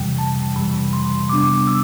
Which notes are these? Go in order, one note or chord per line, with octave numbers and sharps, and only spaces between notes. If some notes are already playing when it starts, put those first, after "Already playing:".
Already playing: F2 C3 E3 G3 G5
A5
F2 C3 E3 G3 B5
C6
C3 G3 B3 D4 D6
E6